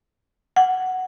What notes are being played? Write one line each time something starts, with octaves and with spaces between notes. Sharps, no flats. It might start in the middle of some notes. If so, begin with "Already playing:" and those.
F#5